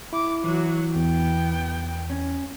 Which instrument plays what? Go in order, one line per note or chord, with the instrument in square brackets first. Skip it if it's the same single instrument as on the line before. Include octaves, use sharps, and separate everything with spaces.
[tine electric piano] E4 [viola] D6
[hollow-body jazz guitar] E3 [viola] F#3 F#4
[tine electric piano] E2 [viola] B3 G5
[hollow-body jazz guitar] C#4